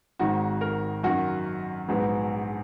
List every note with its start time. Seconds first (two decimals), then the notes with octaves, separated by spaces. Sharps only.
0.19 G#1 G#2 D#3 F#4
0.61 A#4
1.03 F#2 D#3 A#3 F#4
1.88 A#1 G#2 F#3 B3